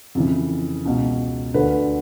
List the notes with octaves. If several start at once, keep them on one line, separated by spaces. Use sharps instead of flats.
F2 C#3 E3
C#2 B2
D2 D3 B4